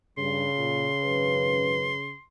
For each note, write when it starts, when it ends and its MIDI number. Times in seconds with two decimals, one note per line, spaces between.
0.18 0.47 43
0.18 2.13 49
0.18 2.23 84
0.57 0.88 46
1.05 1.97 32
1.05 1.97 42
1.05 1.97 71